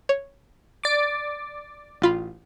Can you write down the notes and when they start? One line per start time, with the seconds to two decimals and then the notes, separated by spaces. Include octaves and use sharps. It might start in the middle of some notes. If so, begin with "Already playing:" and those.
0.09 C#5
0.83 D5 D6
2.02 A1 F4 B5